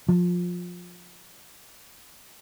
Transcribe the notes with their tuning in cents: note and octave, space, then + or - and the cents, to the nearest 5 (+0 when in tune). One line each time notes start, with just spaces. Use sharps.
F3 +20